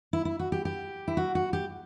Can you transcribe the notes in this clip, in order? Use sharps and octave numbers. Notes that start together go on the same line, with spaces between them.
E4
E4
F#4
G4
G4
E4
F#4
F#4
G4